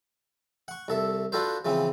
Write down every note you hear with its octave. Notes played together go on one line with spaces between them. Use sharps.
F#5 C#6
C2 A4 E5
D4 F4 F#4 A4 B4 C5
C#3 E3 F3 C4